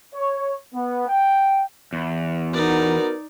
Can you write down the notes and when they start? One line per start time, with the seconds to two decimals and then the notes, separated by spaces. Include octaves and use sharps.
0.15 C#5
0.74 B3
1.08 G5
1.93 E2
2.54 B3 D#4 F#4 A#4 D5